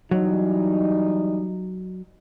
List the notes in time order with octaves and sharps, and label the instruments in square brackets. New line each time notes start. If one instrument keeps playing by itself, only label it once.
[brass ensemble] E3 G3 D#4 [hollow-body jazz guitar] F#3